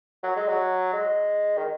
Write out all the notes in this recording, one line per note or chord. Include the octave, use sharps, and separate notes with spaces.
F#3
G#3
F#3
G#3
D#3